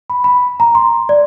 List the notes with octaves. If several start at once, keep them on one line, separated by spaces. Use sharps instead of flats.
B5
B5
A#5
C6
D5